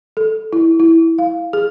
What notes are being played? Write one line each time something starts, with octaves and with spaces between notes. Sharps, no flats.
A4
E4
E4
F5
G#4